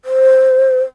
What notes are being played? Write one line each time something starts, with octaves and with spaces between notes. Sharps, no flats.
C5